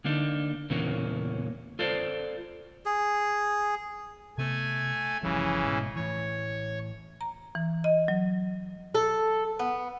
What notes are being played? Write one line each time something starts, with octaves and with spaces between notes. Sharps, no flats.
D3 A#3 D4 D#4
E2 A#2 C#3 E3 A#3 C#4
F4 A4 C5 D5
G#4
C3 A3 B3 G#5
G1 C#3 E3 F3 G3
G#2 B2
A2 E3 C#5
A#5
E3
D#5
F#3
A4
B3